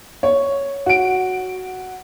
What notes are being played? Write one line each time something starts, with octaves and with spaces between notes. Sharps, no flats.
C#5
F#4 D7